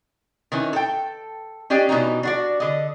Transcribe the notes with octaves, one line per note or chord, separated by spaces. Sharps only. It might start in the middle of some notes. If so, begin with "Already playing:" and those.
D#3 E3 C#4
A4 G5
C#4 D4 G4 D5 D#5
B2 E3 C#4 D#4
D4 F#4 D5
D3 D#5